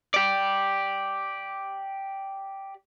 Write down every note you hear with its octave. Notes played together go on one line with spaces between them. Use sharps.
G4 D5